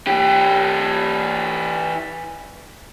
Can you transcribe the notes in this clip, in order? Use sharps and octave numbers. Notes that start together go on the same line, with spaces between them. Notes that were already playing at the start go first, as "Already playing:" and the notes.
E3 G4